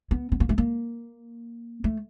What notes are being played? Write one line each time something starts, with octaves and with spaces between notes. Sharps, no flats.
B3
B3
A#3
A3
A#3
A3